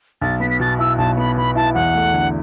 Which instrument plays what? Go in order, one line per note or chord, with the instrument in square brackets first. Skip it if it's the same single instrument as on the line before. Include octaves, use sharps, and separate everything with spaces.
[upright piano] B1 [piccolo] A6
[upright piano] B3 [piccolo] B6
[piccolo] B6
[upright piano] B2 [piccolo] A6
[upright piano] E4 [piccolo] E6
[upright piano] B1 [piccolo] A5
[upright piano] B3 [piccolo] B5
[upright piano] B2 [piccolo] B5
[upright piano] E4 [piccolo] A5
[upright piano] E2 [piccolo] F#5
[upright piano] A3
D3